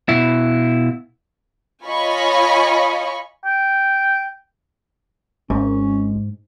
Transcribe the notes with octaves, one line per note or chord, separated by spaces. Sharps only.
B2 E4
F4 C#5 D#5 G#5 B5 C#6
G5
G#1 G#2 G#3 C#4